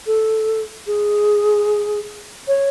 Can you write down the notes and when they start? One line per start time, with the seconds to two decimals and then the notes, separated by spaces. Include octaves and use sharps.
0.07 A4
0.87 G#4
2.48 C#5